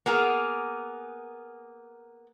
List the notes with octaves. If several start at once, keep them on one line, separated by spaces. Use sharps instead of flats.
A#3 B3 G#4 A#4